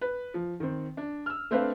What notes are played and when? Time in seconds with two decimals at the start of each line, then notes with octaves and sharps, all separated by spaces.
0.01 B4
0.34 F3
0.60 D#3 C4
0.97 D4
1.26 E6 F6
1.51 A3 C4 D4 B4 F5